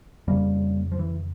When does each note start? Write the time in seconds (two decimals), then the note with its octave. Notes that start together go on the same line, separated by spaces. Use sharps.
0.27 F2 C#3 G3 A#3
0.92 F3
0.99 E3